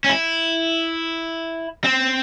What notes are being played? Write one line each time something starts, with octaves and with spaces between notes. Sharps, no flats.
C#4
E4
C4